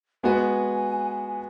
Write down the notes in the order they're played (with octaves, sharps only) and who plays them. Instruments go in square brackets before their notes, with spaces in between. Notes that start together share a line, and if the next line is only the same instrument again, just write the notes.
[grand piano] G#3 B3 F#4 B4 [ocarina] G#5